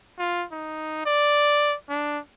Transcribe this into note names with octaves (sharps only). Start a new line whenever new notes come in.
F4
D#4
D5
D4